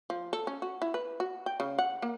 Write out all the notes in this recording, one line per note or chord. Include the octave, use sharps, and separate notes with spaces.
F3
A4
C#4
F#4
E4
B4
F#4
G5
C#3
F#5
A#3